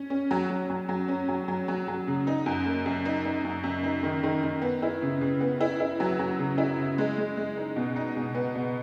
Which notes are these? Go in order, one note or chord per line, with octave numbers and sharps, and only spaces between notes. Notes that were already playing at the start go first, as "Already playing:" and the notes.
Already playing: C#4
C#4
F#3
F#3
F#3
F#3
C#4
F#3
F#3
F#3
F#3
C#3
D#4
F#2
A#3
F#2
D#4
D#4
F#2
F#2
D#4
D#3
D#3
D#3
B3
E4
C#3
C#3
B3
E4
E4
F#3
F#3
C#3
E4
C#3
G#3
G#3
G#3
D#4
B2
D#4
B2
B3
B2